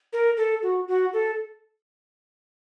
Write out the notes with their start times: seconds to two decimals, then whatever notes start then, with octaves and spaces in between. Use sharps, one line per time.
0.13 A#4
0.37 A4
0.63 F#4
0.88 F#4
1.13 A4